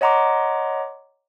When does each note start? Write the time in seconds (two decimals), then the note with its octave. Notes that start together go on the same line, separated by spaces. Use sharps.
0.01 C#5 D#5 F#5 A#5 C6 D6